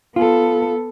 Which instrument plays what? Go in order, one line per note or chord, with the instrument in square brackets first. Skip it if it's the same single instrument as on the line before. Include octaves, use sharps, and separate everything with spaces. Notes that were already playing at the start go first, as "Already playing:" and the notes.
[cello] B3 A4 [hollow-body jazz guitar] F4